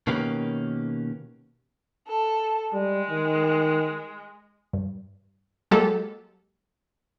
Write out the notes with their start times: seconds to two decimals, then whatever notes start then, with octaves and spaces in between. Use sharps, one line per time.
0.07 B2 D#3 A#3 C#4 G4 B4
2.08 A4
2.73 G3 G#3
3.10 D#3
4.73 G2
5.71 F#3 G#3 A#3 G4 A4